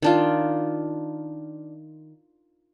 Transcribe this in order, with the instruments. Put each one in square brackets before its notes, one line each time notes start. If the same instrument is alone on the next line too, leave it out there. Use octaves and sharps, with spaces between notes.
[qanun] D#3 D4 F4